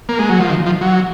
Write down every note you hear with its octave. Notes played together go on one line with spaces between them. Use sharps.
A#3
G#3
F#3
F3
D#3
F3
F#3